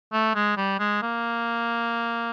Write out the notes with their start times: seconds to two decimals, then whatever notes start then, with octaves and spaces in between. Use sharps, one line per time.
0.13 A3
0.35 G#3
0.57 G3
0.80 G#3
1.02 A#3